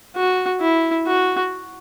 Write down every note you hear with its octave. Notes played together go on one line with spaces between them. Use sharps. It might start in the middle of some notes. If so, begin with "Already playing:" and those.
F#4
E4
F#4